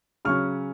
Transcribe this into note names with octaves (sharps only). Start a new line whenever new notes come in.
C#3 F#3 C#4 C#6 F6